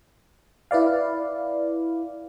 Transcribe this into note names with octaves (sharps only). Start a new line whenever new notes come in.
E4 B4 D5 F5